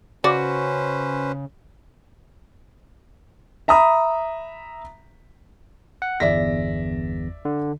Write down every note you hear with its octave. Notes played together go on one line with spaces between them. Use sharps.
C#3 C#4 F#4 B4 C5 D5
E5 A#5 B5 D#6
F#5
G1 E2 D5 E5 A#6 B6
D3